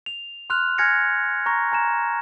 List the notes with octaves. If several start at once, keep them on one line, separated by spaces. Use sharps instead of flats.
F7
C6 F6 F#6 F7
G#5 F6 G#6 A#6 C#7 F7
A#5 C#6 A#6
G#5 A#5 E7